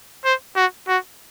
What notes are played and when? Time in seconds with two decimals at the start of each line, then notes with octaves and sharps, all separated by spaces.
0.24 C5
0.56 F#4
0.88 F#4